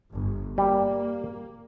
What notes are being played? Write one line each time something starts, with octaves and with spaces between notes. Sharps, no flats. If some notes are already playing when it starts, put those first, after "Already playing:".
G1
G3 A#3